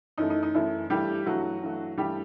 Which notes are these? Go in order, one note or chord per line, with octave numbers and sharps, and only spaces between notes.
F#2 E3 A3 D#4
D#4
D#4
F#2 E3 A3 E4
G2 E3 G3 A3 G4
G2 E3 F#3 A3 F#4
G2 E3 A3
G2 E3 G3 A3 G4